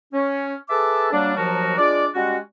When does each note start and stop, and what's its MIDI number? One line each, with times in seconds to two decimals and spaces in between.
0.12 0.54 61
0.69 1.10 68
0.69 1.10 69
0.69 1.10 71
0.69 1.10 76
0.69 1.10 81
0.69 1.10 86
1.11 1.35 54
1.11 1.35 55
1.11 1.35 58
1.11 1.35 62
1.36 1.74 39
1.36 1.74 53
1.36 1.74 54
1.36 1.74 66
1.36 1.74 70
1.36 1.74 81
1.77 2.06 56
1.77 2.06 62
1.77 2.06 65
1.77 2.06 74
2.14 2.37 55
2.14 2.37 56
2.14 2.37 61
2.14 2.37 66